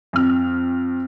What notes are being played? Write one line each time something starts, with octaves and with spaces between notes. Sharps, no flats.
F2 F6